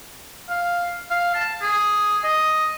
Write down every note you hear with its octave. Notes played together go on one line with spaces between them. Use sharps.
F5
F5
A5
G#4
D#5